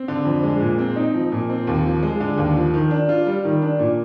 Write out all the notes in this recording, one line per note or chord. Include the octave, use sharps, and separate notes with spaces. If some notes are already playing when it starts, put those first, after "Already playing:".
Already playing: C4
D3
F2
G#3
A#2
C4
D#4
F3
A#2
C4
D#2
F3
G#3
D3
D#2
F3
D#3
D4
F4
G3
D#3
D4
A#2